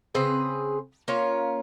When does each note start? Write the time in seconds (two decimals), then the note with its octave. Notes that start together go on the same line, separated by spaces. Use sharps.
0.15 C#3 C4 G#4 B4
1.08 A#3 C#4 F4 C#5